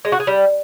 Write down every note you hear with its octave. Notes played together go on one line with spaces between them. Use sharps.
G#3
F#4
G#4
G3